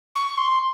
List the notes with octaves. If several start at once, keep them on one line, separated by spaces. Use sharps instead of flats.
C#6
C6